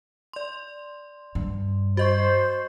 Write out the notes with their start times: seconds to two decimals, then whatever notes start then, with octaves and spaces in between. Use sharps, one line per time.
0.33 D5 C6
1.35 G2
1.97 F#4 C5 D#5 C#6